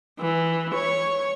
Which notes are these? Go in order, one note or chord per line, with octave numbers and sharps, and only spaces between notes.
E3
C#5 C#6